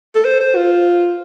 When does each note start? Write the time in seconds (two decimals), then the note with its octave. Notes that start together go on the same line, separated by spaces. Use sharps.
0.15 A4
0.25 C5
0.41 C5
0.56 F4